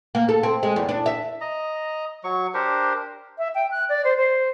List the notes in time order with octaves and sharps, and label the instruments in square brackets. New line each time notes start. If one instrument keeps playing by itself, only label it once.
[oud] A#3
A4
C4
G#3
E2
D4
E5
[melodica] D#5 A#5
F#3 C#6
D4 G4 A#4 C5
[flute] E5
G5
F#6
D5
C5
C5